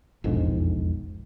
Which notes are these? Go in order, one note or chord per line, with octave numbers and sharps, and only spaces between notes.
E1 A#1 F2 G#2